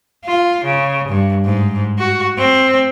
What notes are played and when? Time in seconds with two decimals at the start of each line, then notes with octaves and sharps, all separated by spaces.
0.25 F4
0.65 C#3
1.09 G2
1.45 G#2
1.98 F#4
2.38 C4